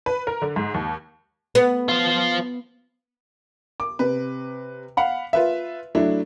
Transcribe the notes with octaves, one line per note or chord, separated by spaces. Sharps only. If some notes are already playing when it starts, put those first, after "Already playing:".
B4
A#4
D3
G#2
D#2
B3
F4 C5
D6
C3 B4
F5 F#5 B5
F4 B4 E5
F#3 A3 D4 E4